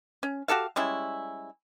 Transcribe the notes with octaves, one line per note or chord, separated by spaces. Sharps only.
C#4
F#4 G4 A4 F5
G3 G#3 C#4 E4